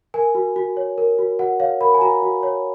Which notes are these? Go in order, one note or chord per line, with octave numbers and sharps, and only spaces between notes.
A#4 G#5
F#4
F#4
C#5
A#4
F#4
F#4 F#5
C#5 F5
A#4 B5
G#5
F#4 A#5
F#4
C#5